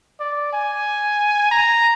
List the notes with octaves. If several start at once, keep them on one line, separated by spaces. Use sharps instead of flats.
D5
G#5
A#5